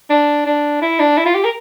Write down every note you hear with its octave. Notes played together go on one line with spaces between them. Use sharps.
D4
D4
E4
D4
E4
F4
G4
A#4